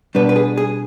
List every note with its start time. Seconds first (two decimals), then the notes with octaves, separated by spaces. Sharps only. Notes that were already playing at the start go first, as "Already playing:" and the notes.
0.15 B2 G3 D4 B4
0.29 B4
0.36 G#4
0.57 G#4